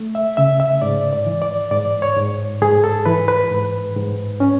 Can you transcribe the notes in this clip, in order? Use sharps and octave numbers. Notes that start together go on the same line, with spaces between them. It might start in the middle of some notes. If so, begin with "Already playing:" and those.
Already playing: A3
E5
C#3 E5
E5
G#2 D5
D5
E3
D5
G#2 D5
C#5
G#2
G#2 G#4
A4
E3 B4
B4
G#2
G#2
C#4